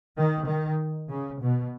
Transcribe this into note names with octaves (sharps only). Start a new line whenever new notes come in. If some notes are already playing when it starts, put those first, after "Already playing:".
D#3
D#3
C#3
B2